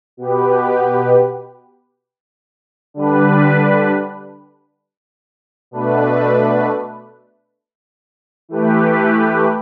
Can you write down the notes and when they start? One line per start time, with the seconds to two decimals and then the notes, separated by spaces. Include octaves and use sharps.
0.17 B2 B3 G4 B4
2.94 D3 G3 D4 B4
5.71 B2 A3 D4 B4
8.49 E3 A3 G4 B4